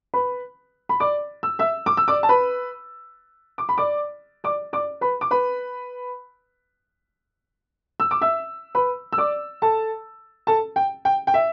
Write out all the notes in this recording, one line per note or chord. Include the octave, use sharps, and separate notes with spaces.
B4 B5
B5
D5 D6
E6
E5 E6
D6
E6
D5 D6
A5
B4 B5
D6
B5
D5 D6
D5 D6
D5 D6
B4 B5
D6
B4 B5
E6
D6
E5 E6
B4 B5
E6
D5 D6
A4 A5
A4 A5
G5
G5
G5
E5